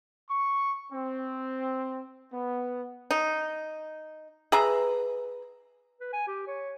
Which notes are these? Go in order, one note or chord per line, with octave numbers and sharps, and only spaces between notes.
C#6
C4
B3
D#4
G#4 B4 E5 A#5
B4
G#5
G4
C#5